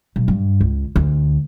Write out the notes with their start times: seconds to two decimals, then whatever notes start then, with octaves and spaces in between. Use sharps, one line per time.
0.16 B1
0.28 G2
0.61 C#2
0.96 D2